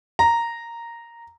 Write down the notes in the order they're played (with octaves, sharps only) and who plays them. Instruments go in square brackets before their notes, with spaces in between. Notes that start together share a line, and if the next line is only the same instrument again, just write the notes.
[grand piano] A#5